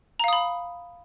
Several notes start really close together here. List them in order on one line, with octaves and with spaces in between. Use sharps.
A#5 F5 D#6 B5